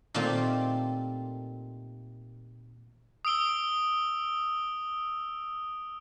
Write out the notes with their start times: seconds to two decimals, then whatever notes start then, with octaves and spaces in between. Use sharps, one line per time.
0.14 A#2 D#3 A3 C4 F4 G4
3.25 D#6 E6 D7 G7